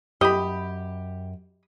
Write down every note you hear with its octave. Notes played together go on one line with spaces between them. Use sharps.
F#2 G4 D#5 B5